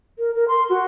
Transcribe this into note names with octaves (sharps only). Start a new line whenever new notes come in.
A#4
A#4
C6
F#4